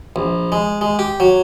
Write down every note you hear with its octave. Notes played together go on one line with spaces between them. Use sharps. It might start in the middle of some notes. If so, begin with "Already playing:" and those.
A#1
G#3
G#3
G4
F#3